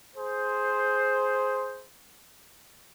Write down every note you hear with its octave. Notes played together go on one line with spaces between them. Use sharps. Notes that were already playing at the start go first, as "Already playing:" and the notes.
G#4 C5